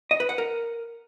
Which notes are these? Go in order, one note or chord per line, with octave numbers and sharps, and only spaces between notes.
D#5
B4
F#5
A#4